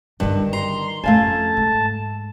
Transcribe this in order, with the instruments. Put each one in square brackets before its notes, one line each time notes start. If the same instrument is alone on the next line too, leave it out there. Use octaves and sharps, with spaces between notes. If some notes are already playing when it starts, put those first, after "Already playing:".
[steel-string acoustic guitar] G2 [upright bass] D3 E4 [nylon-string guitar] D#3
[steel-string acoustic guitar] A#5 [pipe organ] C6
[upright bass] F2 C#3 [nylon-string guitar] A3 F5 G#5 [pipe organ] A5
[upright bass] G#2